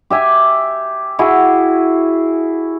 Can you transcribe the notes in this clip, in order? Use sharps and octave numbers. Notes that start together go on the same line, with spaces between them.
G4 E5 G#5
E4 F#4 G#4